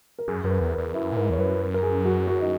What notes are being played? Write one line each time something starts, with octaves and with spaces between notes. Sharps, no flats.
A#4
F#2 G#4
F#2 A#4
B4
E2
A#4
E2
F#2 E4
A#2
G#2 A#4
E2 C#5
F#2 B4
A#4
A#4
G#4
F#4
F#4
D#4